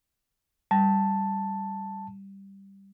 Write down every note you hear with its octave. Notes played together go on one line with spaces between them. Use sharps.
G3 A5